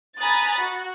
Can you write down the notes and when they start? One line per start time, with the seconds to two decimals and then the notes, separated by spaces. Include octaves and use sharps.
0.18 G#5 A#5 B5 D#6 F#6 A6
0.58 F#4